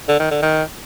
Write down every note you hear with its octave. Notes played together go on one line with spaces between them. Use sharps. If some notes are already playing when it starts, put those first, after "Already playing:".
D3
D#3
D3
D#3